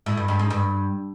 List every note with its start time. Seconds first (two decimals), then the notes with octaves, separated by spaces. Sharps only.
0.06 A2
0.17 G2
0.28 G2
0.39 G#2
0.50 G2